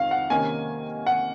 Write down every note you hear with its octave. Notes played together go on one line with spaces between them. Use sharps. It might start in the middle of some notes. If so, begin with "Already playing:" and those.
Already playing: F2 D#3 F5
F#5
C3 D#3 A#3 C#4 G#5
F#5